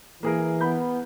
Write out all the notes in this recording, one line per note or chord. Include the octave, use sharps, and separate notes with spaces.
E3 A#3 G#4 A#4
B3 B5 G6